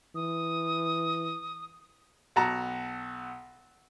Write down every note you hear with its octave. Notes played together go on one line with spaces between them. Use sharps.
E3 D#6
B1 F#4 F#5 A5 A#5